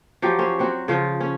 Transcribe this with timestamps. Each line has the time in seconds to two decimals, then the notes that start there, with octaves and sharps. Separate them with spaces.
0.22 F3 F#3 G4
0.39 C#4 C5
0.59 F#3 C4 F#4
0.88 C#3 F3 F4
1.20 C#4